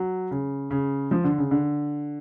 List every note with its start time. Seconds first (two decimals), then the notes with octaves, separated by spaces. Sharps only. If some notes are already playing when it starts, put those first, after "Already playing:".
Already playing: F#3
0.31 C#3
0.70 C#3
1.11 F3
1.24 D3
1.38 C#3
1.51 D3